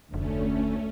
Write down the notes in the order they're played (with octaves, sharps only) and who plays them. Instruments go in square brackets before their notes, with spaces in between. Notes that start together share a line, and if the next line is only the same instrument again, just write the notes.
[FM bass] F1 [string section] D2 [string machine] A3 C#4